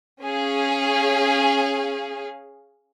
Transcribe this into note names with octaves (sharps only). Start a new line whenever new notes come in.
C#4 G#4 F5